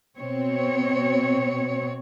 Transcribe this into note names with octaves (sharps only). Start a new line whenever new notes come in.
B2 C4 C#5